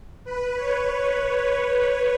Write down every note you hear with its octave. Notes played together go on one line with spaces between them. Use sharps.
B4
C#5
B4